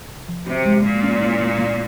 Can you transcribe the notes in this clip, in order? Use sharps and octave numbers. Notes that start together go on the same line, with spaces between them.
C3
F3
C3 F#4
G#3
A#2 G#3
C#4
E4
A#3
A#3